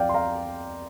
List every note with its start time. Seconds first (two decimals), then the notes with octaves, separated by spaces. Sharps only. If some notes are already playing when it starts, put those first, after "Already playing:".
Already playing: F2 F3 D5 F5 G5
0.09 C6
0.14 F5 A#5